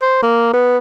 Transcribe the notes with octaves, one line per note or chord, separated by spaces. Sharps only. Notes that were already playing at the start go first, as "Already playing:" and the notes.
C5
A#3
B3